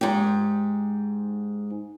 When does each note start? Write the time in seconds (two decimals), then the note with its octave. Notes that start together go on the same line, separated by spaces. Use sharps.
0.01 G#2 G4